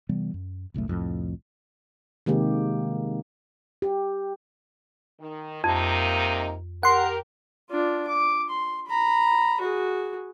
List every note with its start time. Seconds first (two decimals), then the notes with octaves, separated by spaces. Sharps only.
0.09 C3 E3 G3 B3
0.34 F#2
0.74 G1 C2 F#2 A3
0.88 C2 F2 A2
2.26 C3 D#3 G#3 A#3 G4
3.82 G4
5.20 D#3
5.64 F2 C3 A#3 D#4
6.83 G4 A#4 F#5 C6
7.70 D4 F4
8.07 D6
8.50 C6
8.87 A#5 B5
9.60 F#4 G#4